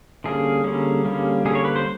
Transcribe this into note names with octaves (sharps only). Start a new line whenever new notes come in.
D3 G3 A#3 C#4 G#4
D3 G3 A#3 C#4
D3 G3 A#3 C#4
D3 G3 A#3 C#4 G#4
C#5
B4
C5